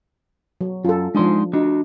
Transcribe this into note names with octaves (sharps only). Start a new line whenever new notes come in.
F#3
F#2 F4 A4
F3 G#3 D4 D#4 C6
D4 D#4 F#4